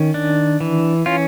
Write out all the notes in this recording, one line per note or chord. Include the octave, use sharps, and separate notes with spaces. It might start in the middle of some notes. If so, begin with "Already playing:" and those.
Already playing: D#3 C#4
D4
E3
C#4 F4